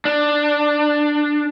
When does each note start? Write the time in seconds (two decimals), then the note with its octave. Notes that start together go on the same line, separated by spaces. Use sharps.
0.05 D4